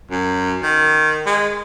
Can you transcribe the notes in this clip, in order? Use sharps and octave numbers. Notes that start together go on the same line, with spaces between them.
F#2
D#3
G#3